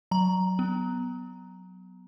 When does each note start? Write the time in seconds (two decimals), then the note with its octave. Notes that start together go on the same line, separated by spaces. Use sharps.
0.11 F#3 A#5
0.59 B3